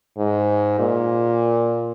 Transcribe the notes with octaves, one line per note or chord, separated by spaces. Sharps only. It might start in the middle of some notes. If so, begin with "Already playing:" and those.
G#2
A#2